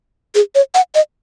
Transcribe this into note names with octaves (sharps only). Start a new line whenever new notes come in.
G#4
C#5
F#5
D#5